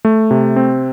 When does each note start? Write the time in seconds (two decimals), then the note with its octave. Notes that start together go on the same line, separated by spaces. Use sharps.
0.05 A3
0.31 C3
0.56 C4